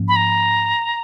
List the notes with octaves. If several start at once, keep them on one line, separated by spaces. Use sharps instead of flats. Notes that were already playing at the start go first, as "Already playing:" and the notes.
Already playing: G#2 F3 A#3 C#4
B5
A#5